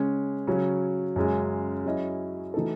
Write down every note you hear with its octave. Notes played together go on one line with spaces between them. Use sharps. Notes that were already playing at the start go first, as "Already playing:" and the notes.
Already playing: C#3 G#3 C#4
C#3 F#3 C#4
F#2 C#3 G#3
F#3 C#4 E4 G#4 D#5
E3 A3 D#4 F#4 A4